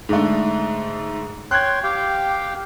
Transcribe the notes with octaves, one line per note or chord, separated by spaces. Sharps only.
G#2 D3 A3
C#5 G5 C6 F#6 G#6
G4 F5 G5